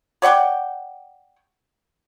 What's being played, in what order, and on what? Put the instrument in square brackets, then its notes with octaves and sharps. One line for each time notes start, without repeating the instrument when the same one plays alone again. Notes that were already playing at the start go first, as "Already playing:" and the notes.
[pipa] C#5 D5 F#5 G5